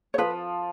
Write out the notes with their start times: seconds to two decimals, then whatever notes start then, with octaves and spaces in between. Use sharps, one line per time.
0.14 C#5
0.18 F3 B4